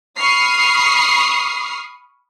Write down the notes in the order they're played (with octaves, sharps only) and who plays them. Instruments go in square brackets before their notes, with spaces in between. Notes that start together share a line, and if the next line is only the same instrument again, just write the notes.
[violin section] B5 C#6 D#6 F6 C7